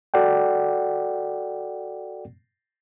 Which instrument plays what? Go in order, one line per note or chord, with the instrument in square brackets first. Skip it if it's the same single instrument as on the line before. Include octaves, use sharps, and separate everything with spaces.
[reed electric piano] F#4 A4 D5 F#5 G5